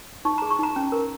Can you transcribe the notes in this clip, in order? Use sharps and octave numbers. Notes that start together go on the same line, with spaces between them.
D#4 C#6
G#4 A#5
C#6
D#4 A#5
C#4
A#4